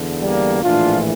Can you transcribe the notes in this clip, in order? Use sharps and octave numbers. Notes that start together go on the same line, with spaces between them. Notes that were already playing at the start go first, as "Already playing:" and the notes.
Already playing: E2 D3
G3 A#3
A#1 A2 E3 D4 F4